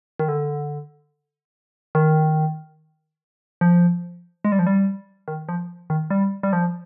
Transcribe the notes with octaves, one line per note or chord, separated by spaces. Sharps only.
D#3
D3
D#3
F3
G#3
G3
F3
G3
D#3
F3
D#3
G3
G3
F3